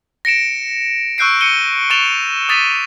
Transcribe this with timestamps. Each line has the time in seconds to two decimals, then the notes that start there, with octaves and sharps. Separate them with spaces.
0.25 A#6 C#7 D7 E7
1.18 C#6 E6 F#6 G6 C7 D7
1.41 C#7 D#7 G7
1.90 C#6 A6 E7 F7 G7
2.48 D6 D#6 A6 B6 D#7 F7